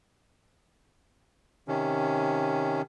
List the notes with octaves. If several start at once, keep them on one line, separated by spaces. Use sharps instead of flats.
C3 D#3 C#4